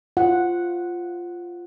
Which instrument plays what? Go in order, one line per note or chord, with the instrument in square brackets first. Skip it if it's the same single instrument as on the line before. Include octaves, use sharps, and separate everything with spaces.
[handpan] F4 F#5